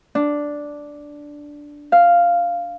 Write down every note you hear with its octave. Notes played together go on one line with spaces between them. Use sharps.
D4
F5